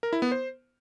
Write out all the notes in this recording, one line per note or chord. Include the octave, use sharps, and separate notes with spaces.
A#4
E4
B3
C5